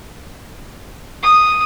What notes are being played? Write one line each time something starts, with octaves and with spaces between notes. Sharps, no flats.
D#6